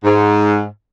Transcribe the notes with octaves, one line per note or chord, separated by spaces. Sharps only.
G#2